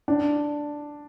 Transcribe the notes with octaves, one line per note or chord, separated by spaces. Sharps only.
D4